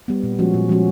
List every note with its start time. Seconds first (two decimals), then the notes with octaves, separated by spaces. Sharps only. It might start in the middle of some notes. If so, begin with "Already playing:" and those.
0.08 G3 B3
0.23 A#2
0.39 F3 G#3 C#4 F#4
0.54 A#2
0.69 F3 G#3 C#4 F#4